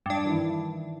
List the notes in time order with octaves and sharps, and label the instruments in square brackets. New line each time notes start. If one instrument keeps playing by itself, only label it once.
[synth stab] G2 D4
[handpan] D#3 E3 E4